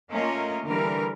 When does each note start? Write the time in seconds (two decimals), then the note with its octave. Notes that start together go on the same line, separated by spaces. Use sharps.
0.11 A3 A#3 C#4 F4 A#4 D#5
0.65 D3 E3 G3 A#4